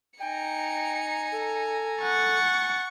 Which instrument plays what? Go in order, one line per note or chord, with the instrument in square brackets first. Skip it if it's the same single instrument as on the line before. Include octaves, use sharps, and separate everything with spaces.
[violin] D#4 C#7 [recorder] G5 [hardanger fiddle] G#5 A#5
[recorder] A4
[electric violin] F#5 A6 [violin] C#6